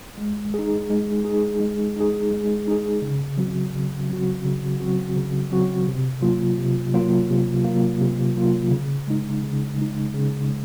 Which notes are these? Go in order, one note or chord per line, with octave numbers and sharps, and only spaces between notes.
G#3
D#4 G#4
G#3
D#4 G#4
G#3
D#4 G#4
G#3
D#4 G#4
C#3
F#3 C4 F#4
C#3
F#3 C4 F#4
C#3
F#3 C4 F#4
C#3
F#3 C4 F#4
C3
F#3 A#3 F4
C3
F#3 A#3 F4
C3
F#3 A#3 F4
C3
F#3 A#3 F4
C#3
G#3 D#4
C#3
G#3 D#4
C#3
G#3